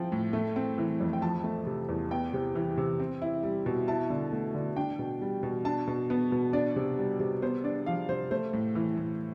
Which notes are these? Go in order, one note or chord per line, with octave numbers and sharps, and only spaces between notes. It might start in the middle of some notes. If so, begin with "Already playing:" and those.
Already playing: F3 C4 E4 G5
A2
A3
C4
E3
F2
G5
F3 A5
A3
C3
E2
B3 G5
C3
E3
C3
C4
E4
G3
B2
E4 A5
D3
A3
D3
D4 G5
B2
G3
B2
D4 A5
B2
B3
B2
D4 D5
C3
G3
C3
B3 C5
D4 D5
F3 F5
C3 C5
A3 C5
A2
E3
A2